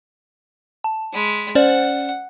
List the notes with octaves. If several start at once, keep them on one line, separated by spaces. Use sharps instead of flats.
A5
G#3 B5
C#4 C5 D5 F#5